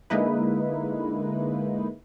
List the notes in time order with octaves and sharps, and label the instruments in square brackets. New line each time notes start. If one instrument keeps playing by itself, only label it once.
[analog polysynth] D3 G#3 A#3 D#4 E4 B4